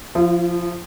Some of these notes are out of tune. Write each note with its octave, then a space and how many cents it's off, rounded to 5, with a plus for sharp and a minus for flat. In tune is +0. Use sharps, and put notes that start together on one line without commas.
F3 +0 F4 -45